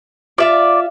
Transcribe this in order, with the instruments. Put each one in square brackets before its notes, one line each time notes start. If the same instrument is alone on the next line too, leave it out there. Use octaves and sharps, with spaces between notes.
[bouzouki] F4 E5 F5 [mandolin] D5